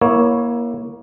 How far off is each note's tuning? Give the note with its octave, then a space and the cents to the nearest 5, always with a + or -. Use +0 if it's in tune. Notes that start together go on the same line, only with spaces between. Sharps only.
A#3 +25 E4 +0 C#5 +5